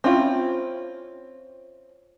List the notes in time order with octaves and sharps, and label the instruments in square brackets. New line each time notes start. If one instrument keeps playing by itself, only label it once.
[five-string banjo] C4 C#4 E4 F4